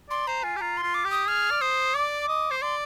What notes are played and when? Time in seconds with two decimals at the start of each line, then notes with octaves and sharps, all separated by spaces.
0.10 D5 C6
0.27 C5 A#5
0.43 F4 G#5
0.56 G4
0.61 F4 A#5
0.77 C6
0.83 F4
0.94 D6
1.05 G4
1.11 D#6
1.27 G#4 F6
1.51 D5
1.61 C5 D#6
1.95 D5 D6
2.28 D#5
2.51 C5
2.62 D5 C6